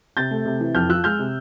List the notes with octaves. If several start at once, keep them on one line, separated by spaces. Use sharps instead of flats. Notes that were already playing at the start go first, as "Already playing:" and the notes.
C3 G6 A6
A3
C3
E3
F2 F6 G6
F3 E6 F#6
G#3 F6 G6
C3